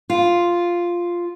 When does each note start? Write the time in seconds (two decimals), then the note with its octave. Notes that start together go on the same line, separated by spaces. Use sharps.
0.10 F4